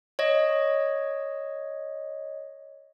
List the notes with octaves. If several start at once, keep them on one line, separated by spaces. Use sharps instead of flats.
C#5 D#5